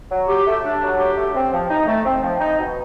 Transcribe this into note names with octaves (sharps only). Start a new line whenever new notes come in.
F#3
G4
A3
D4
F#3
G4
A3
C4
F3
D#4
A3
C4
F3
D#4
B2